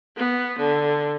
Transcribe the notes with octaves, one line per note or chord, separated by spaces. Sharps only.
B3
D3